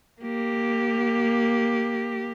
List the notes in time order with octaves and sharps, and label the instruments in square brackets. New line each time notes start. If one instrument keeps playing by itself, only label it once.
[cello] A#3 G4